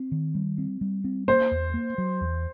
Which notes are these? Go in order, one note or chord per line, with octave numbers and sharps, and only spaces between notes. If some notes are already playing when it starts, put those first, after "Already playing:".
Already playing: C4
D#3
G3
C4
G3
C4
A#3 C5
E2
A#3
F#3
E2